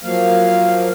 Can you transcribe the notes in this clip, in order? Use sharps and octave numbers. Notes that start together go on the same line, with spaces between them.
F3 F#3 A#3 F5